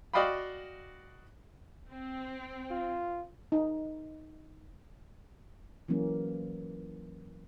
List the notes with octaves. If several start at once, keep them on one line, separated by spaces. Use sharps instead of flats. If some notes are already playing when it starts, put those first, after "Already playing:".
F#4 D5 D#5 F5 G5 B5
C4
F4
D#4
E3 F#3 A#3 C#4